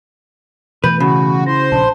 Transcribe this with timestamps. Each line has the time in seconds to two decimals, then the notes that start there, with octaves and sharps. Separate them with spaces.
0.84 B2 E3 A3 B4 G6
1.00 C#3 F#4 B5
1.46 E4 C5 A#6
1.72 A#1 D4 A5 B5